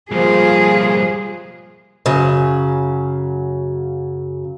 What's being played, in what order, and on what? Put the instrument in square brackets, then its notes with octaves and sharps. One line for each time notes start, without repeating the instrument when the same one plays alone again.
[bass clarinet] F3 [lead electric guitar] G3 A#3 [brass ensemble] F4 [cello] G#4
[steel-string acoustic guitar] F#2 C#3 F#3